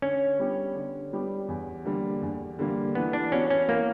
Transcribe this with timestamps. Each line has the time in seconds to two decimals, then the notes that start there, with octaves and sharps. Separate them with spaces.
0.02 D3 C#4
0.39 G3 B3 D4 G4
0.75 D3
1.13 G3 B3 D4 G4
1.48 E2
1.85 D3 G3 A#3
2.22 E2
2.59 D3 G3 A#3
2.95 E3 B3
3.13 D4
3.32 B3 C#4 F#4
3.50 C#4
3.69 E3 A#3